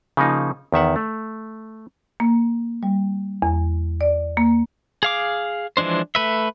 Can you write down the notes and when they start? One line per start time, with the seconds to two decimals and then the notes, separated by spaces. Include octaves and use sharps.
0.17 C#3 F3 A#3 D#4
0.72 E2 D#3 E5 F#5
0.96 A3
2.20 A#3
2.83 G3
3.42 E2
4.01 D5
4.37 A#3
5.03 G#4 F5 D6
5.77 E3 F3 G#3 D4 C5
6.15 A3 B4 E5